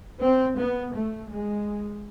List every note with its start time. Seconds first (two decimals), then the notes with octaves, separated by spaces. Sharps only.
0.21 C4
0.58 B3
0.94 A3
1.31 G#3